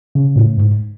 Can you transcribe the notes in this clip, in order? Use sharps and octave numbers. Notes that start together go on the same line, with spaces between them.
C#3
A2
G#2